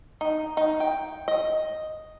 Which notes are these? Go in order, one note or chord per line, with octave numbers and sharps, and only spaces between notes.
D#4
D#4
G5
D#5